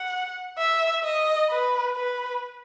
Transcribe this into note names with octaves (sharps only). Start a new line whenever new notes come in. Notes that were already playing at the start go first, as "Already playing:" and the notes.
Already playing: F#5
E5
D#5
B4
B4